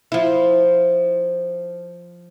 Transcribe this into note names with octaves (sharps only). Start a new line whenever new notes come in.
F3 E4